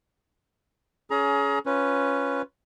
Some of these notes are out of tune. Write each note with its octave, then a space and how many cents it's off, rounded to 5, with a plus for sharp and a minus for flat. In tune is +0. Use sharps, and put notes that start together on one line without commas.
C#4 +20 G#4 +30 A#5 +25
C#4 +0 F4 +0 B4 +0